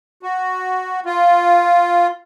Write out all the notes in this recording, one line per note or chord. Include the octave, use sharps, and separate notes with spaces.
F#4
F4